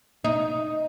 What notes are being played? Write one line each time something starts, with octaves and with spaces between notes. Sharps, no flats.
D#4